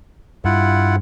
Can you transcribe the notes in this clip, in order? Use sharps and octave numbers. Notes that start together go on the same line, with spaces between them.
G2 E4 F4 F#5